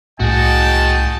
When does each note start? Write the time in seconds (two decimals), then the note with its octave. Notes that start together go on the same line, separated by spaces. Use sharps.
0.20 C2 A2 F#4 G#4 D#5 G5 A5